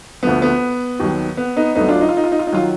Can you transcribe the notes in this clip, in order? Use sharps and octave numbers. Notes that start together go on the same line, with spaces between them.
D2 D3 F3 B3
B3
D#2 D#3 F#3
B3
B3 D#4
D2 D3 F#3 B3 D#4
D4 F4
D#4
F4
D#4
F4
D#4
F4
D#4
D#3 F#3 F4